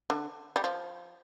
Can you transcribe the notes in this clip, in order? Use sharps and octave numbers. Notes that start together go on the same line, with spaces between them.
D3
G3
F3